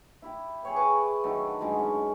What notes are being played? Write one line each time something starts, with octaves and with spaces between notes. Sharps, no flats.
E4 G4
G#4 C#5 G5
B4 C#6 D6
D3 D#3 F#3 A3
F#2 D3 G#3 D#4
C#4